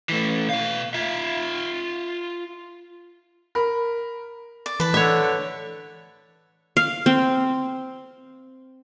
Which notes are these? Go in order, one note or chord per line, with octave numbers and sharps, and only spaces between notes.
E3 A3
B2 F5
F4 E5
A#4 B5
D5
E3 B4 A5
D3 C#5 E5
F5
C4